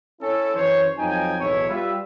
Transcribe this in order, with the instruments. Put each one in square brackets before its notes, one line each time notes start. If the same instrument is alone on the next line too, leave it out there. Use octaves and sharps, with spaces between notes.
[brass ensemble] C#4 E4 A4
F#2 E3 C#4 C5 C#5
F2 F#3 D#4 G5 G#5
B1 E2 A2 E4 C#5
G3 F4 B4 E5